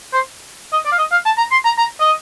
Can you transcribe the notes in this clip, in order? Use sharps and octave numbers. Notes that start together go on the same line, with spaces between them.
C5
D#5
D5
F5
D#5
F5
A5
A#5
C6
A#5
A#5
D#5